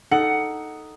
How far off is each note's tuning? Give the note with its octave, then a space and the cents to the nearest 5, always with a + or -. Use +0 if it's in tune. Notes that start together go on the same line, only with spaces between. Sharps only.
D#4 +0 A4 +0 F#5 +10